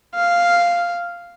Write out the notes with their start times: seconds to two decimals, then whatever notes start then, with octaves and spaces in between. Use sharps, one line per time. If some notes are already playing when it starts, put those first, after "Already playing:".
0.15 F5